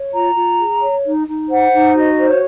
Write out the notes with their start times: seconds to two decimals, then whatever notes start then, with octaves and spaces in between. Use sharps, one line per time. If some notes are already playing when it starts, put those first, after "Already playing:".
Already playing: C#5
0.12 F4 A#5
0.35 F4
0.58 G#4
0.80 C#5
1.04 D#4
1.26 D#4
1.49 C5 F#5
1.72 D#4
1.94 F#4 D#5
2.17 C5
2.25 C#5